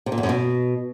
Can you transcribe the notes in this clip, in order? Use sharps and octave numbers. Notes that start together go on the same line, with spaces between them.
C3
A#2
E2
F#2
B2